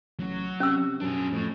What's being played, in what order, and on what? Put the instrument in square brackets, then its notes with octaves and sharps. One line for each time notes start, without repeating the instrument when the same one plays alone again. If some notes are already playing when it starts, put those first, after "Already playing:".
[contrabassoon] A1 [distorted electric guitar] F#3
[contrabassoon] C3 [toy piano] C#4 E6
[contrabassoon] F#2 [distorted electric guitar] D4 G#4
[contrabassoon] F2 [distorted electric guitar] A2